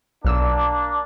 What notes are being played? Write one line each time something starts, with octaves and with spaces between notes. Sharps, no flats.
B1 A#3 D4 E6